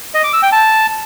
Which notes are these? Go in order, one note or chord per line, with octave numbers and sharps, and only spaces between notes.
D#5
D6
E6
G5
A5